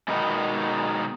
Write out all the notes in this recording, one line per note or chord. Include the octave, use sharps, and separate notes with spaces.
B2 D#3 G#3 B3 D#4